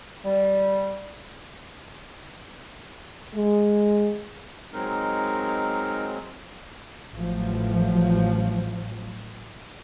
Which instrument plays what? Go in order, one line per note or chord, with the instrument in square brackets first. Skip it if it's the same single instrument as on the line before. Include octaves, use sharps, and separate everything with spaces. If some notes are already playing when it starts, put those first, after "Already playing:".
[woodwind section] G3
[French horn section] G#3
[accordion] F#3 G#3 C4 [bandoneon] D#4 A#4
[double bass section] A1 A2 F3 F#3